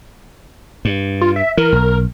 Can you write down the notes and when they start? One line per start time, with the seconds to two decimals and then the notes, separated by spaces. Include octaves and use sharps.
0.85 G2
1.21 F4
1.36 E5
1.57 E3 A#4
1.72 B1